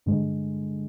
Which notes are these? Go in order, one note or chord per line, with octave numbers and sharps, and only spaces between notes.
G2 D3 G#3